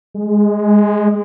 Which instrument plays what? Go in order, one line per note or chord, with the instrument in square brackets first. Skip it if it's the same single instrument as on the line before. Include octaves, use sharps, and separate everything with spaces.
[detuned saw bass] G#3